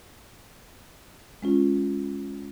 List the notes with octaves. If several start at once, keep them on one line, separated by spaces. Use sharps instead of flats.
G#3 C#4 F4